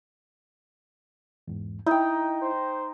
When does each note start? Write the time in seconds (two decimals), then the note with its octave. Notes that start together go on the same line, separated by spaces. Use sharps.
1.48 E2 G#2
1.87 D#4 E4 G5
2.42 C5